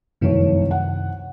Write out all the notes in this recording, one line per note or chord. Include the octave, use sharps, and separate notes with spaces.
F1 C2 F#2 C3 D#3 C#5
F#5